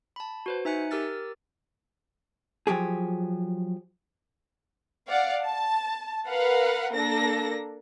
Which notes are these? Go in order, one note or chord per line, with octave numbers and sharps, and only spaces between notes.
A5 B5
F#4 B4 C5
D#4 E5 G#5 F#6 C#7
G4 A#4 E6 F6 A6
F3 F#3 G4 G#4
D5 F5 F#5
A5
A#4 B4 F5 F#5
A#3 D4 A4 A#6